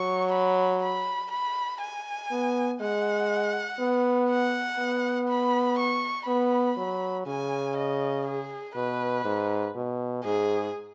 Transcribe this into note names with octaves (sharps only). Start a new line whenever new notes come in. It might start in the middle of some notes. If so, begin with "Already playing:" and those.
Already playing: F#3 C#6
B5
B5
B5
G#5
B3
G#3 F#5
B3
F#5
B3
B5
C#6
B3 B5
F#3
C#3 G#5
D#5
G#4
B2 B4
G#2
B2
G#2 G#4